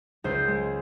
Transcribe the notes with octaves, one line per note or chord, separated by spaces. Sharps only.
C#2 C5
G#3